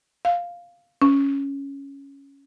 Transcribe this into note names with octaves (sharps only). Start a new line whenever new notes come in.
F5
C#4